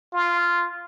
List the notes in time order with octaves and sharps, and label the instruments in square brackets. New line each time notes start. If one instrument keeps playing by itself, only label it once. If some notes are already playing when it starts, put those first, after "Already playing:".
[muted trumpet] F4